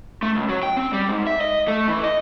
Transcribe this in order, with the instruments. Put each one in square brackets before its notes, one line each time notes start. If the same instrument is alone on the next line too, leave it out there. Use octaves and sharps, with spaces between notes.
[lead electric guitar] A3
C#2
F#3
G5
C4
G3
G#2
E5
D#5
A3
E3
D#5